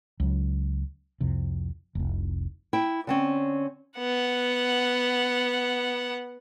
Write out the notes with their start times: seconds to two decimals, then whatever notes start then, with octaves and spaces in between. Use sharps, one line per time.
0.20 C#2 F#3
1.20 C2 F2 C3
1.95 F1 C2
2.73 E4 G5
3.07 D3 C4 C#4
3.98 B3 F#5